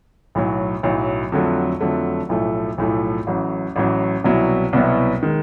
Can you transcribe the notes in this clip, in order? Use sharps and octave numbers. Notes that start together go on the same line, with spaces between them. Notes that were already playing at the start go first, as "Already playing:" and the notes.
B1 A2 F#3
B1 A2 F#3
F2 D3 F#3 A3
F2 D3 F#3 A3
B1 A2 F3 A3
B1 A2 F3 A3
A1 A2 F#3
A1 A2 F#3
C2 B2 F#3 B3 E4
C2 B2 F#3 B3 E4
D#3 G#3